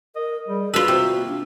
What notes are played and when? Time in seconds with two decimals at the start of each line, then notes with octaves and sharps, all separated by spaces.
0.16 A#4 D#5
0.48 G3 G#4
0.74 F4 F#4 B4 E6
0.88 C3 F#4
1.15 A#3
1.29 D4